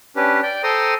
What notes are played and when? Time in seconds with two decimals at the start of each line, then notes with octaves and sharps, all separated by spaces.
0.16 C#4 D4 G4 B4
0.43 D5 G5
0.64 A4 C5 G5 A#5 C6 D#6